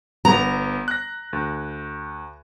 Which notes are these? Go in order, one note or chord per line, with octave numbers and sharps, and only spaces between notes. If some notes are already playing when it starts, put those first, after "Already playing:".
G1 B3 A#5
F#6 A#6
D2